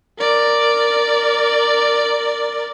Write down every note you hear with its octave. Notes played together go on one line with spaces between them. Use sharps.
A#4 D5